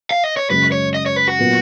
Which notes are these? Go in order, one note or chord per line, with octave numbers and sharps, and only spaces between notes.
F5
D#5
C#5
F#2 C#3 G#3 B4
C#5
D#5
C#5
B4
F#4
A#2 F#3 B3